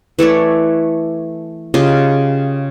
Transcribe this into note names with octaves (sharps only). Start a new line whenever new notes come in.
E3 A3 C#5 D5
C#3 F4 G4 D#5